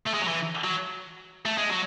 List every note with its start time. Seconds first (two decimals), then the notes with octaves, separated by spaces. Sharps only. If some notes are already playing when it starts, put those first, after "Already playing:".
0.06 A3
0.14 G#3
0.21 F#3
0.28 E3
0.64 F#3
1.46 A3
1.58 G#3
1.70 F#3